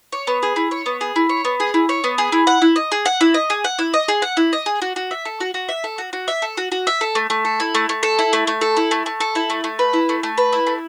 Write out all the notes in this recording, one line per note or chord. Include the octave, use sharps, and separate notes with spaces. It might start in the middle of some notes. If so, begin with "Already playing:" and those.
C#5
B3
G#4
E4
C#5
B3
G#4
E4
C#5
B3
G#4
E4
C#5
B3
G#4
E4
F#5
E4
D#5
G#4
F#5
E4
D#5
G#4
F#5
E4
D#5
G#4
F#5
E4
D#5
G#4
F#4
F#4
E5
A4
F#4
F#4
E5
A4
F#4
F#4
E5
A4
F#4
F#4
E5
A4
A3
A3
A4
E4
A3
A3
A4
E4
A3
A3
A4
E4
A3
A3
A4
E4
A3
A3
B4
E4
A3
A3
B4
E4
A3